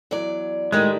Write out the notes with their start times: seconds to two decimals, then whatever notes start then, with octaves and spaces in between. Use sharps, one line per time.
0.11 E2 F#3 D5
0.72 A2 D#3 G3 G#3